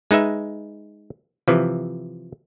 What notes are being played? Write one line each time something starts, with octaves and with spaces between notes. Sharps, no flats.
G#3 D#4 B4 E5
C3 E3 F3